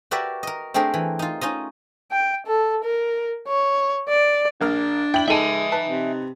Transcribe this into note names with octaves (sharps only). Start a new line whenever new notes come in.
F#4 G4 A#4 B4 D5 E5
A#4 D#5
A3 C4 D4 G4 G#4 A#4
E3
D#4 F4
C#4 D#4 F4 D#5
G5
A4
A#4
C#5
D5
A#1 A#3 D4 F6
E4 G5 F#7
G#3 D#4 G#4 A4 E5 G#5 A5 D#7
B4 A5
C3